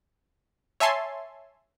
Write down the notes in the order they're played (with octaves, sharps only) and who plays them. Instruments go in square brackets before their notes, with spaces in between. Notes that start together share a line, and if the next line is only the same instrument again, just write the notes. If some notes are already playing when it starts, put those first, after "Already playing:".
[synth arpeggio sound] C#5 E5 G#5 A5 C6